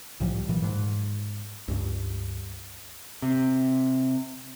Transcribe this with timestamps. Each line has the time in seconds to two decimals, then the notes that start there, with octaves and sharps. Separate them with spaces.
0.20 C2 A2 F3 G3
0.49 A#2 E3 F#3
0.62 G#2
1.68 C#2 G2
3.22 C3